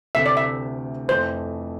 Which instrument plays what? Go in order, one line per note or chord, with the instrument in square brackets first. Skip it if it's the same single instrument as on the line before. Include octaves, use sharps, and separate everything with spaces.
[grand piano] D2 C3 E3 A3 [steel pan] E5
[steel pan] D5
E5
[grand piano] F2 E3 A3 [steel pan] C5